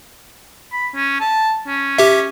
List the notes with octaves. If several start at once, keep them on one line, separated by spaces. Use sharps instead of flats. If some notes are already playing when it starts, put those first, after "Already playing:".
B5
C#4
A5
C#4
G4 E5